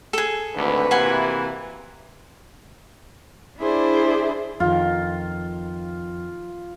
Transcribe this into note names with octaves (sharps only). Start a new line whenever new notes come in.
G#4 A4
G#1 D2 F#4 B4
C3 E3 A#3 F#5 G#5 C6
D4 E4 G#4 C5 D5
F2 D#3 F4